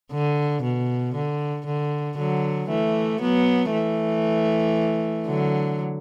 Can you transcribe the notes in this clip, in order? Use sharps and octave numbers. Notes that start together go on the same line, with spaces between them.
D3
B2
D3
D3
D3 F#3
E3 A3
F#3 B3
E3 A3
D3 F#3